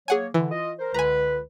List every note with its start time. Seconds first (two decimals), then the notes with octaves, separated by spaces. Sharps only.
0.08 F#3 A#3 G#4 C#5 F#5 G#5
0.34 D3 E3
0.51 F4 D#5
0.79 A#4 C5
0.94 C#2 D3 B4 G#5 A#5